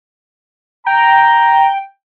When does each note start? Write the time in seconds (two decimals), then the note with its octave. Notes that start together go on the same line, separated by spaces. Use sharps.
0.87 G5 A#5